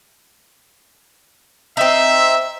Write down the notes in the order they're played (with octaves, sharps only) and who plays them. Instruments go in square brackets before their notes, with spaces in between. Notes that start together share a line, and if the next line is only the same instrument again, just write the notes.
[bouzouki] C4 D#4 [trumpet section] E5